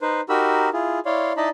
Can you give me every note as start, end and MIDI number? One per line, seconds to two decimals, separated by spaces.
0.01 0.21 63
0.01 0.21 71
0.01 0.21 72
0.29 0.69 63
0.29 0.69 66
0.29 0.69 67
0.29 0.69 70
0.29 0.69 83
0.29 0.69 88
0.73 0.99 64
0.73 0.99 65
0.73 0.99 68
1.06 1.33 64
1.06 1.33 73
1.06 1.33 74
1.06 1.33 77
1.06 1.33 84
1.37 1.49 63
1.37 1.49 64
1.37 1.49 74
1.37 1.49 75
1.37 1.49 81
1.37 1.49 83